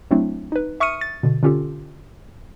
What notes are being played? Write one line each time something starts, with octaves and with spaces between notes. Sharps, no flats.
F#3 A3 C4 D4 E4
D#4 B4
E5 C#6 D#6 F6 C#7 D#7
A6
B2 D3
D3 C#4 F4 G4 A4